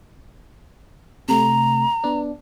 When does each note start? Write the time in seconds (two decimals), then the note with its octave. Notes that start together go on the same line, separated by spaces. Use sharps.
1.29 C3 A3 A#5
2.04 B3 D4